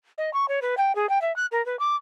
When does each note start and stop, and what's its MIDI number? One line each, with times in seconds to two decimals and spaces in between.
0.18 0.33 75
0.34 0.48 85
0.48 0.60 73
0.62 0.75 71
0.78 0.95 79
0.95 1.09 68
1.09 1.21 79
1.22 1.34 76
1.36 1.46 90
1.52 1.64 70
1.66 1.79 71
1.79 1.96 86